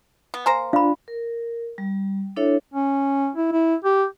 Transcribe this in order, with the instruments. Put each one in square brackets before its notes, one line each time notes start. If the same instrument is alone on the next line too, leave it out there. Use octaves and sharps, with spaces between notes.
[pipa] B3
[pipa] A#3 C5 A#5 [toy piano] G#5
[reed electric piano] D4 F4 [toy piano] F5 B5
[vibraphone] A#4
G3
D4 E4 A4 C#5 E5
[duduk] C#4
E4
E4
G4